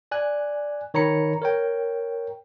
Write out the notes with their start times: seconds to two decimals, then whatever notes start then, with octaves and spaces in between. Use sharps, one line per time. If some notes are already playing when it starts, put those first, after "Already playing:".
0.11 D5 G#5 F#6
0.94 D#3 C#5 A#5 B5 C#7
1.42 A#4 C#5 G5